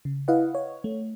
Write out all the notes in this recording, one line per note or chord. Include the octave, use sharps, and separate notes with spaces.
C#3
E4 B4 D#5 F5 F#5
C#5
A3